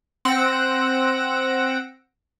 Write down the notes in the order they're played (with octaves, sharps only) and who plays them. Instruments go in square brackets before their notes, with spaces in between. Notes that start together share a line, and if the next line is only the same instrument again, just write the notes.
[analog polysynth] C4 F#5 E6 A#6 D7